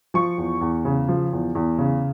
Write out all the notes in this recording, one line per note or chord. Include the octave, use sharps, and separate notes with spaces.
F3 C#6
E2
E2
C#3
F3
E2
E2
C#3